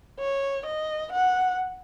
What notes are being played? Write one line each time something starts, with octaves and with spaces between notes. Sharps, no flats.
C#5
D#5
F#5